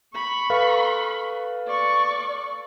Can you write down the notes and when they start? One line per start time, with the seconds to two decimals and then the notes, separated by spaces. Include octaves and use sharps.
0.14 B5 C#6
0.50 A4 B4 F5
1.68 D5 C#6